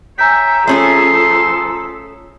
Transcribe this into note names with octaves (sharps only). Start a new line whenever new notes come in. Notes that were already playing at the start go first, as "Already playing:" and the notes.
C#5 E5 G5 G#5 A#5 B6
F3 A3 C#4 G#4 A4 C6